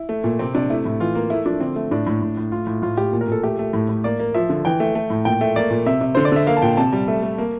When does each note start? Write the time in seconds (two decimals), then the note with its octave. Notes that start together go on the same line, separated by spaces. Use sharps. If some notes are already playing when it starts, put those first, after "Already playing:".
Already playing: E4
0.09 A3
0.24 A#2
0.39 C3 C4
0.55 C3 D4
0.70 A3 E4
0.85 A2
1.00 E3 F4
1.15 A#3
1.30 A3 E4
1.46 F3 D4
1.61 D3 C4
1.76 A3
1.91 A2 D4
2.07 A2
2.22 A2
2.37 A2
2.52 A2 F4
2.67 A2
2.82 A2 F4
2.97 A2 G4
3.13 A#2
3.21 A#4
3.28 A#2 A4
3.43 A3 G4
3.59 A3
3.73 A2
3.89 A2
4.04 A#3 D5
4.20 A#3
4.34 F3 E5
4.50 D3
4.65 E3 G5
4.80 A3
4.95 A3
5.10 A2
5.25 A#2 G5
5.41 A3
5.56 A#3 D5
5.71 A#2
5.86 C3 E5
6.01 C3
6.15 D3 C5
6.25 D5
6.32 D3 E5
6.47 A#3 F5
6.57 A5
6.62 A#2 G5
6.77 C3 A5
6.93 G3
7.08 A3
7.23 A3
7.38 A#3